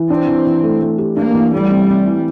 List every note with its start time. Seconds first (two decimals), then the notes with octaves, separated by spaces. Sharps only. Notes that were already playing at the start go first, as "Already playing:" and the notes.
Already playing: E3
0.09 C4 D4
0.27 E3
0.45 E3
0.63 A3
0.81 A3
0.98 G4
1.16 A#3 D4
1.34 E3
1.53 G3 A3
1.70 C4
1.88 C4
2.06 E3